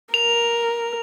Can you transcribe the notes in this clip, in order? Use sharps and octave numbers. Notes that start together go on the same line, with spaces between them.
A#4 F7